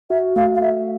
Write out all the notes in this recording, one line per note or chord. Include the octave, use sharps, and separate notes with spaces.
F#4 E5
A3 F5
F5
A3 E5